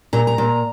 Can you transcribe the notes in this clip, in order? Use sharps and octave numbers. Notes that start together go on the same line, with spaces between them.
A#2 A#5
A#5
A#2